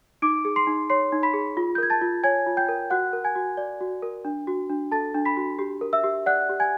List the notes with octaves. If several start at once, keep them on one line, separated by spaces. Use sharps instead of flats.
D#4 D6 D7
G#4
C6 C7
D#4
C#5 C6 C7
D#4
B5 B6
G#4
F4
G6
A#4 G#6
A5 A6
F4
C#5 G#5 G#6
F4
G5 G6
A#4
F#4 F#5 F#6
A#4
G#5 G#6
F#4
D5
F#4
A#4
D4
F#4
D4
A4 A5 A6
D4
B5 B6
F#4
G4
A#4
E5 E6
G4
D5 F#5 F#6
G4
G#5 G#6